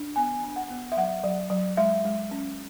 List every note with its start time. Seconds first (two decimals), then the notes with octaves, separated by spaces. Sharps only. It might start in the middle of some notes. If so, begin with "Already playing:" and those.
Already playing: D4
0.16 B3 G#5
0.44 D4
0.56 F#5
0.70 B3
0.92 E5
0.97 F#3 F#5
1.24 F#3
1.50 F#3
1.77 G#3 E5
2.05 G#3
2.31 C#4